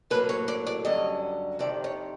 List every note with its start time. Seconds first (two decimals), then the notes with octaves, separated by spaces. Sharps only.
0.10 A2 F#3 A#3 B4
0.29 C#5
0.48 D5
0.67 D5
0.85 G2 D3 F#3 C#4 D#5
1.59 F2 C3 D#3 D5
1.84 C#5